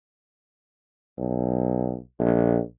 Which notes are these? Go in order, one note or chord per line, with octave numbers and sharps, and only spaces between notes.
B1
A#1